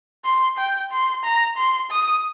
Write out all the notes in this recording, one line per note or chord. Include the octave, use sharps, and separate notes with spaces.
C6
G5
C6
A#5
C6
D#6